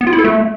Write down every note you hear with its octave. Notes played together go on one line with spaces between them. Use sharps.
B3
F4
E4
A4
A3